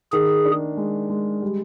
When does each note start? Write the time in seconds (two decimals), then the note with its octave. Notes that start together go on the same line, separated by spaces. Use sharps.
0.12 D#3 G#4
0.45 D4
0.77 G#3
1.10 G#3
1.42 G3